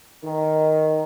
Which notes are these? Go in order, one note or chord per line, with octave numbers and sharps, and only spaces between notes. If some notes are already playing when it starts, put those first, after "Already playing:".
D#3